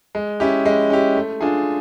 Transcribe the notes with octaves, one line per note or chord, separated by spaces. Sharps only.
G#3
C#4 E4 G4
G#3
C#4 E4 G4
A3
D4 F4 G#4